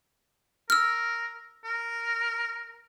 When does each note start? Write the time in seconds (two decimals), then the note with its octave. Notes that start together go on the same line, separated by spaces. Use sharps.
0.70 A#4 E6 F6
1.65 A#4